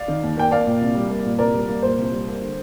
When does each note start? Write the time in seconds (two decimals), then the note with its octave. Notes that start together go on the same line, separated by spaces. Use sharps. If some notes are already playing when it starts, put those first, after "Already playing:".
Already playing: D5 F5
0.08 D#3
0.23 D#2
0.37 A#3 G5
0.51 A#3 D5 F5
0.66 A#2
0.81 C2
0.95 G3
1.10 A#3
1.25 A#2
1.39 C2 A#4 D5
1.54 G3
1.69 A#3
1.82 A#2 C5
1.98 C2
2.12 G3
2.27 A#3
2.42 D3